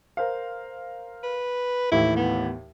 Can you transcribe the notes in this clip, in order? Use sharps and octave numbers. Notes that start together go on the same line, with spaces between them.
A#4 C5 F5
B4
D#2 A2 E3 E4
B3